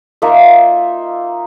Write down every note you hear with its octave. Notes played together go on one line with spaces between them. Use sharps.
A#3 D#4 F4 E5